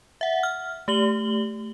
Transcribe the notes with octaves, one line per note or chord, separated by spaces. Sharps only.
E5 F#5
F6
A3 G4 F#7 G7